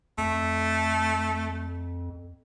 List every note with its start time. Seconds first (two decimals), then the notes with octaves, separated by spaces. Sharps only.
0.18 F2 A3